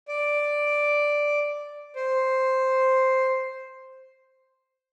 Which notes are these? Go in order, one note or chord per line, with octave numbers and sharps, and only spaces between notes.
D5
C5